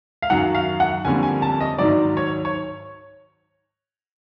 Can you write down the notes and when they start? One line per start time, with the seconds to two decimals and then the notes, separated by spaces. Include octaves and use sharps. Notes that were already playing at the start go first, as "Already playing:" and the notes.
0.22 F5
0.30 F#2 D#3 F#3 F#5
0.55 F5
0.80 F#5
1.05 F2 D3 G3 A#3 C#4 G#5
1.23 G#5
1.42 A5
1.60 D#5
1.78 G#2 D#3 F#3 D5
2.17 C#5
2.45 C#5